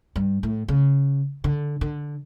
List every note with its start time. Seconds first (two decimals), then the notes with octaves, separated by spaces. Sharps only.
0.16 G2
0.43 A2
0.68 C#3
1.44 D3
1.81 D3